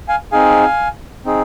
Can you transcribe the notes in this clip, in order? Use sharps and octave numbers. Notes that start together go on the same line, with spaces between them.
F5 G#5
C4 D#4 G#4 F5 G#5
C4 D#4 G#4